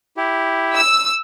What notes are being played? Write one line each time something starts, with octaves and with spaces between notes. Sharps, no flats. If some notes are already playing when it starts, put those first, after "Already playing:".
E4 G4
E6